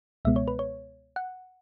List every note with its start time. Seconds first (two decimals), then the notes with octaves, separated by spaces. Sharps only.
0.25 C#2 B2 G#3 B3 E5
0.36 C#5
0.48 B4
0.59 C#5
1.16 F#5